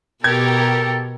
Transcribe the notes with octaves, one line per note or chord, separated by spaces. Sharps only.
B2 G4 A4 A#4 G#6